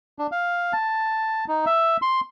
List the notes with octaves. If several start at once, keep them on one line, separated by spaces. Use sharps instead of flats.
D4
F5
A5
D#4
E5
C6